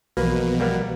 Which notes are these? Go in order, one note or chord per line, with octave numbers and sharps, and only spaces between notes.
B1 B2 E3 F3 A#3 B4
G3 A#3 B3